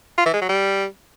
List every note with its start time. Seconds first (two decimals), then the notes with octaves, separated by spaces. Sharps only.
0.18 F4
0.26 E3
0.34 G#3
0.41 F#3
0.49 G3